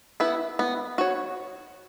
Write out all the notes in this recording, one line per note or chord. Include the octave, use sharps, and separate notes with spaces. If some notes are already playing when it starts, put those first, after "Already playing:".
B3 E4 B4
B3
F#4 C#5